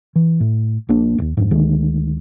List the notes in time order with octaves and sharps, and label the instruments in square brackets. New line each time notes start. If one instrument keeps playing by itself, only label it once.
[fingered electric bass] E3
A2
A#1 A#3 D4
D#1 D#2
F2 G#2
D2 D#3 G#3